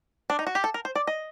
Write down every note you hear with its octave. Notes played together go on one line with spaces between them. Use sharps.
D4
D#4
F#4
G4
A4
A#4
C5
D5
D#5